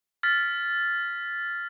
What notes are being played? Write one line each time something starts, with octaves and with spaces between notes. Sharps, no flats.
F6 A6 B6